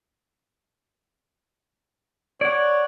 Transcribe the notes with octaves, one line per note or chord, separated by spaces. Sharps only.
C#5 D5 F#5